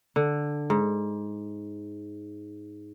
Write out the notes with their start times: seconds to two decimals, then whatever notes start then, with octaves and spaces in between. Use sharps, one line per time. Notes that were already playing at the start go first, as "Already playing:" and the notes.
0.16 D3
0.70 G#2